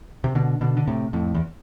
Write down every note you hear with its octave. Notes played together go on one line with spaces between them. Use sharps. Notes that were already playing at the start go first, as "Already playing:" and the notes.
C3
B2 D3
B2 D3
D3
A2 C3
F2 A2
E2